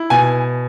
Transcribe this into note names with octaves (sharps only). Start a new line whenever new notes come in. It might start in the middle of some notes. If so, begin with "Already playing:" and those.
Already playing: E4
B2 G#5